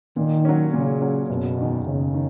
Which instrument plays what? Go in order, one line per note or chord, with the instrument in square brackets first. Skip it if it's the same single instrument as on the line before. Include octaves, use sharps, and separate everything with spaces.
[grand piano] A#2 [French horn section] D#3
[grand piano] F#3 C#4
[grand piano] A#2 [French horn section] C#3
[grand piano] F#3 C#4
[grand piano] F#1 [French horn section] B2
[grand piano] E2 D#3
[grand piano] F#1 [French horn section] C#3
[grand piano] D#3